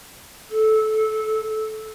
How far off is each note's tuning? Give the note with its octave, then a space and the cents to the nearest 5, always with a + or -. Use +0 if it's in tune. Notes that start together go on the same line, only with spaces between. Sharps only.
A4 -20